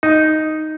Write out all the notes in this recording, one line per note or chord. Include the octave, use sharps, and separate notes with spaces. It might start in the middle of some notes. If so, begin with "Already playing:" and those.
D#4